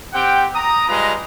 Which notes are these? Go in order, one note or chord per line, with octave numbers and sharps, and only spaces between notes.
C4 G4 F#5 G5
A#5 D#6
G3 G#3 F4 B4 D#5 A#5